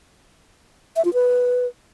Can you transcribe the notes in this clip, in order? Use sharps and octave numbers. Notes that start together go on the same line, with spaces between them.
E5
F4
B4